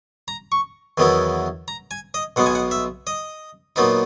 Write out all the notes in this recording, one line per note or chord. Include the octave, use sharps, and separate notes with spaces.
A#5
C#6
E2 D#3 F#3 B3 E4
A#5
G#5
D#5
B1 B2 G#3 B3 F#5
G#5
F#5
E5
D#5
A#2 F#3 B3 D#4